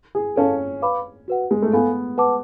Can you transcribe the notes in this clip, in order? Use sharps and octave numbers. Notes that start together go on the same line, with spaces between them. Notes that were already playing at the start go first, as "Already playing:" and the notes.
G#4
C#4 A4 F5 A5
B4 F5 B5 D6
F#4 B4 F#5
G#3
A3
B3 A4 F5 G#5
B4 F#5 A5 D6